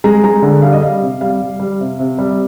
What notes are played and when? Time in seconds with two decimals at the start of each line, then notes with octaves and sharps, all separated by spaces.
0.04 G#3 A#5
0.24 G#3 A#5
0.42 D3
0.62 G3 F5
0.73 D#5
0.82 G3 F5
1.02 C3
1.21 G3 F5
1.41 G3
1.60 G3
1.80 C3
2.00 C3
2.18 G3